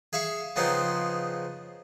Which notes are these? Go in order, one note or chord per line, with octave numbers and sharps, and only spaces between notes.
G#4 E5 F5 C#6
C#3 F3 B3 C4 D#4 G#4